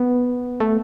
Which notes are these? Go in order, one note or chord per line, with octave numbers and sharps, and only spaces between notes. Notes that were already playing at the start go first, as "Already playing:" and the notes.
Already playing: B3
A3